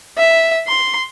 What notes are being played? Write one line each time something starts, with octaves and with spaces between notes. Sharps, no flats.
E5
C6